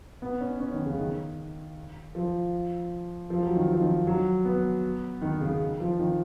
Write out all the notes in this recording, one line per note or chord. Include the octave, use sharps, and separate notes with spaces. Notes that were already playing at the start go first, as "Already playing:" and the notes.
B3
C#4
C#4
D#3
C#3
D#3
F3
F3
F#3
D#3
F3
D#3
F#3
B3
D#3
C#3
F3
D#3